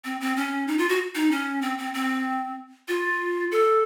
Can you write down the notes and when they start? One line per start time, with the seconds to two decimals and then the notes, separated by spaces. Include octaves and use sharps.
0.05 C4
0.21 C4
0.36 C#4
0.68 D#4
0.78 F4
0.89 F#4
1.15 D#4
1.31 C#4
1.62 C4
1.78 C4
1.94 C4
2.88 F4
3.52 A4